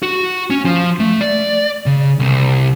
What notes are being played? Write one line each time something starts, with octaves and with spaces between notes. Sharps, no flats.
F#4
C#4
F3
A3
D5
C#3
C2